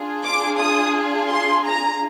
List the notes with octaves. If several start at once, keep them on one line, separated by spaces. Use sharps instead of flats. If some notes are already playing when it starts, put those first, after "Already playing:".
Already playing: D4 F4 G#4
D6
D#6
C6
A#5